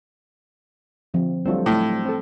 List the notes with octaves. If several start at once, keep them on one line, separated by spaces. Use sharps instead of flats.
D3 F3 C4
F#3 G3 A3 C4 D4 F4
A2
C4 A4